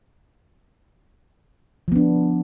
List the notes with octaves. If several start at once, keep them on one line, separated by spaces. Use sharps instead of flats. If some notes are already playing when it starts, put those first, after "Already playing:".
F3 B3 D4